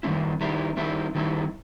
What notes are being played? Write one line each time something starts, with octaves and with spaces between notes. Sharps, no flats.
D#3 G3 C4 E4
D#3 G3 C4 E4
D#3 G3 C4 E4
D#3 G3 C4 E4